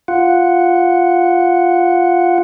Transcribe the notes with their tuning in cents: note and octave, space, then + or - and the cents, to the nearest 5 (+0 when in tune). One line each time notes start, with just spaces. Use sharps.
F4 +0 F#5 +0